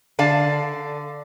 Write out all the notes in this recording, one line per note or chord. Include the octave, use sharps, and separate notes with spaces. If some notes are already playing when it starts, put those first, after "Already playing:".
D3 D5 F5 A5